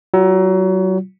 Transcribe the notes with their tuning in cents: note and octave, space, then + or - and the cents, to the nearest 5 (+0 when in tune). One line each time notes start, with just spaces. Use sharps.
F#3 +30 F4 +0